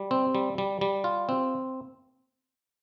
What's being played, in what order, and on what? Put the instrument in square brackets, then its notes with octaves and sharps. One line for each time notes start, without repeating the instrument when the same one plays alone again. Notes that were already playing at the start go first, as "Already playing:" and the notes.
Already playing: [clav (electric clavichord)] G3
C4
G3
G3
G3
F4
C4